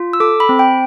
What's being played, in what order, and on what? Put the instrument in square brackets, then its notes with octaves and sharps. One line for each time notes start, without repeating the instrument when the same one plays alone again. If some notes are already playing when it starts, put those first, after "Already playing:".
Already playing: [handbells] F4
E6
A4 D6
B5
C4
G5